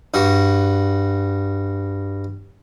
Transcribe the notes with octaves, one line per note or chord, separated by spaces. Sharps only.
G2 F#4